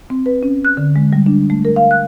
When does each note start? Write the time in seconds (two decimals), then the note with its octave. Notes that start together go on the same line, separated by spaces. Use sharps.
0.10 C4
0.26 B4
0.43 C#4
0.65 F#6
0.77 D3
0.96 G#3
1.13 G3
1.26 D4
1.50 A3
1.65 A#4
1.76 F5
1.91 F#6